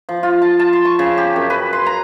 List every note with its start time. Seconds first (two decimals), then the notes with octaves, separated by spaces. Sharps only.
0.09 F3
0.23 F4
0.42 A5
0.59 A5
0.73 C6
0.85 C#6
0.99 C#3
1.18 G4
1.36 F#2
1.50 B4
1.73 C6
1.86 A#5